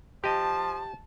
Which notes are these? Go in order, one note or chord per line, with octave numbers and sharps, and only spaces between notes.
F3 G4 D#5 A5